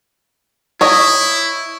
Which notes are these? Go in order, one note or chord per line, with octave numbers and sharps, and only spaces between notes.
E4 C#5 D#5 C#6